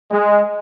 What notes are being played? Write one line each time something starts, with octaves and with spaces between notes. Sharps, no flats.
G#3